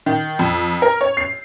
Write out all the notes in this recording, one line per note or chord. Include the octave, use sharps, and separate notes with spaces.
D#3
F2
A#4
C#5
C7